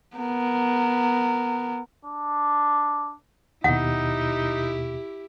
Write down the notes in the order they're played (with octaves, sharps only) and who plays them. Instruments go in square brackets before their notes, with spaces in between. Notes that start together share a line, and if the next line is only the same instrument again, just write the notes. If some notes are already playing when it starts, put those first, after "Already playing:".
[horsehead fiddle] B3 A#4
[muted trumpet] D4
[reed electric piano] D#2 B2 [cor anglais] D#4 [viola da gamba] E4 G4 [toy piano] F#5